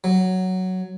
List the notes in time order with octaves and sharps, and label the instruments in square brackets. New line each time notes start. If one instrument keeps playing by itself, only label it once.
[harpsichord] F#3